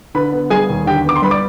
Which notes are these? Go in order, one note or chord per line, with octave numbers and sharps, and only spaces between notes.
D3 B4 B5
B3
G3 G#4 G#5
D#2
D3 G4 G5
B3 D6
C6
G3 B4 B5
D5 D6